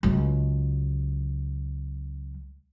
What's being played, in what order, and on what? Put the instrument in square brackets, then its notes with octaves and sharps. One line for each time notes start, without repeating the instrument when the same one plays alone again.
[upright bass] C#2 F#3